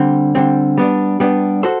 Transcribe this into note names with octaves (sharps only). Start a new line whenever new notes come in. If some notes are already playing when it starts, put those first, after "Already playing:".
Already playing: D3 G3 C4
D3 G3 C4
G3 B3 D4
G3 B3 D4
F#4 A4 C5